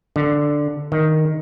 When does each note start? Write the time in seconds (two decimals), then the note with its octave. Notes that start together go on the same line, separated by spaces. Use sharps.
0.16 D3
0.92 D#3